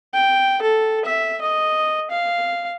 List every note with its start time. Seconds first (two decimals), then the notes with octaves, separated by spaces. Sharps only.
0.14 G5
0.62 A4
1.05 E5
1.41 D#5
2.11 F5